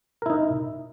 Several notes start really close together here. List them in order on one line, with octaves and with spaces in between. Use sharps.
A#4 E4 D#4